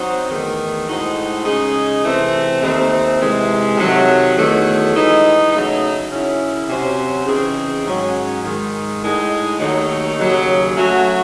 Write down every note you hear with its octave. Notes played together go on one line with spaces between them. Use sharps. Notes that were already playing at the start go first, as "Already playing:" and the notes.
Already playing: F#3 C4 D#4 F#4 C5
E2 D#3 A3
A2 G#3 D#4 F#4 C5
C#3 G#3 D#4 G#4
C3 E3 A3 C4
D#2 D#3 A3 C4
C3 E3 G#3
C3 D#3 F#3 A3
E2 D#3 F#3 A3
E3 G#3 D#4
C#3 F#3 A3 D#4
F#2 C#3 F#3 C#4 E4
C3 F#3 C#4 F#4 C5
C#3 E3 C4 D#4 G#4
G#2 D#3 F#3 C#4 G#4
G#2 D#3 G#3
A2 G#3 D#4
D#2 D#3 F#3 A3 D#4
D#2 C#3 F#3
F#3 A3 C#4 F#4